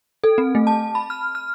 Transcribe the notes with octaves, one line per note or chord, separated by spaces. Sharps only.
A4
C4
A3
A5
B5
F6
F6